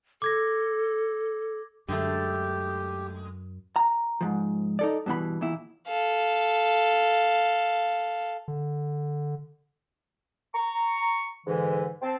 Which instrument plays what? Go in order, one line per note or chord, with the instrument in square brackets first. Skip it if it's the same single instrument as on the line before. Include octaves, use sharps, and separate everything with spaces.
[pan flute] A4 [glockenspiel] D6 G#6 A#6
[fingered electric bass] F#2 [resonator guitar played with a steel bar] D3 G#3 A3 [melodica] G4
[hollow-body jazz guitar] A#5
G#2 F3
D#4 A4 D5
G2 B2 E3 B5
E2 A#2 E4
[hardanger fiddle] A4 F5
[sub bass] D3
[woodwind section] A#5 C#6
G#2 D3 E3
C4 A5